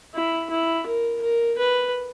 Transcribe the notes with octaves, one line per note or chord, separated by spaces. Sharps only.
E4
E4
A#4
A#4
B4